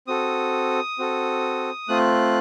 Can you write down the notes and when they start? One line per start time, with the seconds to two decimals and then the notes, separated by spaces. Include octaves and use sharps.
0.07 C4 F#4 A4 D#6
0.99 C4 F#4 A4
1.89 A3 C4 F4 F#6